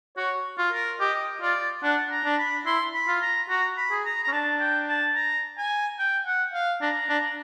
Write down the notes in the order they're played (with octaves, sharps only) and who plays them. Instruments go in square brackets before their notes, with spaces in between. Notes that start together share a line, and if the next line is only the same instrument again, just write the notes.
[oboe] F#4 [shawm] C#5
[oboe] F4
[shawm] A#4
[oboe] G4 [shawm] D#5
[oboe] F4 [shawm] D5
[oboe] D4 [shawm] F#5
[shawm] A#5
[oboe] D4
[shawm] B5
[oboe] E4 [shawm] C6
[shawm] B5
[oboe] F4
[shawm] A#5
[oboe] F#4 [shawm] A#5
[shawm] B5
[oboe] G#4
[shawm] A#5
A#5
[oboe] C#4
[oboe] D4 [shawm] A5
[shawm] G5
A5
A#5
G#5
G5
F#5
F5
[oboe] D4 [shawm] A#5
[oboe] D4